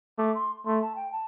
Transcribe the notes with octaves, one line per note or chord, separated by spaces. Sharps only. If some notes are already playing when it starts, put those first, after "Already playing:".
A3 D6
C6
A3 C6
A5
G5
A5